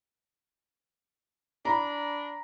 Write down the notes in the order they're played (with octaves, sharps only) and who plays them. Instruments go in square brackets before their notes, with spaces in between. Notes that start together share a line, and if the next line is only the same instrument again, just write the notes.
[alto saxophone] D4 [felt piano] A#5 B5